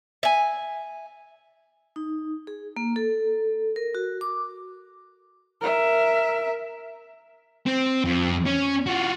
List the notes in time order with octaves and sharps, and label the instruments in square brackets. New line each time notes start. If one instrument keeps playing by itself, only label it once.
[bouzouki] E5 G#5
[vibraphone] D#4
G#4
A#3
A4
A#4
F#4
D6
[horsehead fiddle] A#4 E5
[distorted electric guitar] C4
F2
C#4
F4 F#4